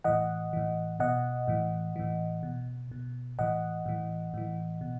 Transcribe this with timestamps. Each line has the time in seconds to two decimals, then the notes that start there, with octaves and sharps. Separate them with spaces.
0.04 A2 E3 D#5 F#5
0.53 A2 E3
1.00 B2 D#5 F#5
1.48 A2 E3
1.96 A2 E3
2.43 B2
2.92 B2
3.39 A2 E3 D#5 F#5
3.86 A2 E3
4.34 A2 E3
4.81 B2